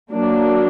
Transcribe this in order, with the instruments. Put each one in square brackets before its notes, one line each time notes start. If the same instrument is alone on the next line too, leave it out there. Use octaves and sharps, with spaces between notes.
[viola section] F#3 A#3 D4